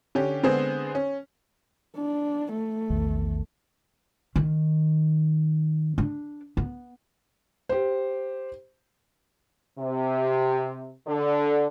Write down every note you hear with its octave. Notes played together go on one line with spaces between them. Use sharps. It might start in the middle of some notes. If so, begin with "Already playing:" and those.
D3 C#4 G4
D3 G#3 B3 C4 G#4 C5
C#4
D4
A3
A#1 E2 D#3
D#3
D4
B3
G4 C5
C3
D3